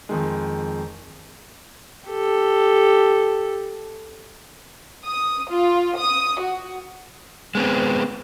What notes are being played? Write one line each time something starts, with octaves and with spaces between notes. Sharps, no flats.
F2 D#3 G#3
G4 A4
D#6
F4
D#6
F#4
G#3 B3 C4